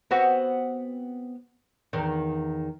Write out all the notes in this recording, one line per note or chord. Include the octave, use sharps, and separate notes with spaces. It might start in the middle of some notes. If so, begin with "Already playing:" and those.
B3 C4 F#4
E2 D#3